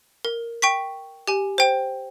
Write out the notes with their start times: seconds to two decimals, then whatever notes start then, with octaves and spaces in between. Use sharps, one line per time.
0.25 A#4
0.62 G5 C#6 B6
1.27 G4 G#5
1.58 C5 G5